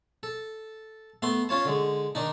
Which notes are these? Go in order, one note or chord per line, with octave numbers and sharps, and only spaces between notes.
A4
A3 B3 C6
C#4 F4 C#5 A5
D3 G#3
D#3 D4 D#4